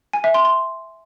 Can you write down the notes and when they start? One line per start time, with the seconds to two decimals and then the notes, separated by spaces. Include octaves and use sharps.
0.13 G#5
0.24 E5
0.34 C6
0.45 C6